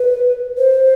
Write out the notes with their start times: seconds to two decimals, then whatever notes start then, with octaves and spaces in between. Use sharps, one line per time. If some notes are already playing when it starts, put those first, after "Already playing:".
Already playing: B4
0.58 C5